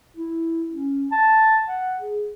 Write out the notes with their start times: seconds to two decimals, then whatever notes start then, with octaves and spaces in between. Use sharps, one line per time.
0.17 E4
0.71 C#4
1.12 A5
1.68 F#5
1.99 G#4